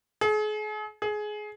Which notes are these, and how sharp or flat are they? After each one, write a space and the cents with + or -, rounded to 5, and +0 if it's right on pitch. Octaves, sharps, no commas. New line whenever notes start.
G#4 +40
G#4 +20